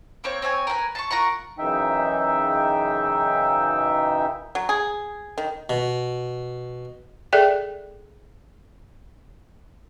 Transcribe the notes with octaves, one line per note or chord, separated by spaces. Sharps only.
A#3 C4 C#5
C4 C#5 F5 G#5
A#4 B4 F#5 G#5
A5 C6 C#6
F4 A#4 F#5 C#6
F#2 C#3 E3 D#4 E5 G5
F#3
G#4
D#3
B2
G#4 A4 D5 E5 G5